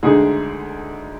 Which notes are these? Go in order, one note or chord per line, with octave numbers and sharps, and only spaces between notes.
D2 D3 G#3 D#4 G#4